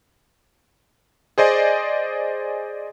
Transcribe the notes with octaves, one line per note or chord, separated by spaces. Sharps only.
G#4 C5 D5 D#5 G#5